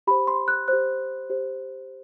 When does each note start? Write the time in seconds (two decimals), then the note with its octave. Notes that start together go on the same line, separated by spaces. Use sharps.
0.07 G4 C5 B5
0.27 C6
0.48 F#6
0.68 G4 C5 F#6
1.30 G4 C5